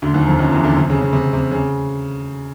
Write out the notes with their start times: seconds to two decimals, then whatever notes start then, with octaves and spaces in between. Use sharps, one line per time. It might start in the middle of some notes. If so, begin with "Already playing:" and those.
0.02 D2 D3
0.14 D#2 D#3
0.27 F2 F3
0.39 F#2 F#3
0.52 E2 E3
0.64 D2 D3
0.77 C3
0.90 C#3
1.01 C#3
1.13 C3
1.33 C3
1.51 C#3